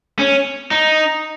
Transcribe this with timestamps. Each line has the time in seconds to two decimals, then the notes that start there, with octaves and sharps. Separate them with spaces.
0.19 C#4
0.71 D#4